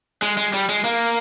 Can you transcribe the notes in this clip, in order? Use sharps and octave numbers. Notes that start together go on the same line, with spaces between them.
G#3
G#3
G3
G#3
A#3